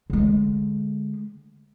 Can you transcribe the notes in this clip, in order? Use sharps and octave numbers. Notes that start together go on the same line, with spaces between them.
D3 G#3